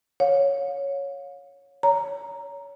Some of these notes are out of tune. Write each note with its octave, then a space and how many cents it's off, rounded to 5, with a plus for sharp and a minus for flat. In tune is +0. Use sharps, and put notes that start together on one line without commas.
C#5 +0 F5 +40
C#5 +30 A#5 +0